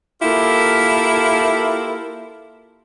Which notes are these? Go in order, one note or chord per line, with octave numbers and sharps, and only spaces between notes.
A#3 E4 F4 G4 A4 A#4